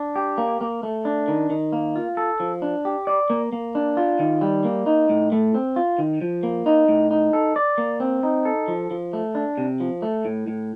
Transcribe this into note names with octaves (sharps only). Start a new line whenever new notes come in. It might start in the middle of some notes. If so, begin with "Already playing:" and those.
Already playing: D4
G4
A#3
A#3
A3
D4
D#3
D#3
A#3
F4
A4
F3
D4
G4
D5
A#3
A#3
D4
F4
D#3
G3
A#3
D#4
A2
A3
C4
F4
D#3
F3
A#3
D#4
A2
D#4
A4
D5
A#3
C4
D#4
A4
F3
F3
A3
D4
C3
F3
A3
A2
A2